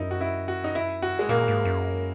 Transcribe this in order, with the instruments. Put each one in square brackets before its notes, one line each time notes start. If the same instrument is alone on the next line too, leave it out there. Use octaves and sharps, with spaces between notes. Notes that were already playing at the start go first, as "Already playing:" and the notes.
Already playing: [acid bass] F#2 [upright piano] D#4 E4
[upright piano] F#4
E4
F#4
D#4
E4
F#4
G#3
[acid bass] A#2 [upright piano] A#3
[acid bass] G#2
F#2